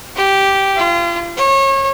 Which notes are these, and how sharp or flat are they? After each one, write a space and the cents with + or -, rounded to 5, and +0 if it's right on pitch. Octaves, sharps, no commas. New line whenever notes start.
G4 -5
F4 -35
C#5 -30